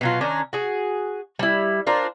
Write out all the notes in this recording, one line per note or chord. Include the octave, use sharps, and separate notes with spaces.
B2 F#3 F4
D#3 C#4 D4 A#5
F#4 G#4
G3 E4
D4 F4 A#4 C5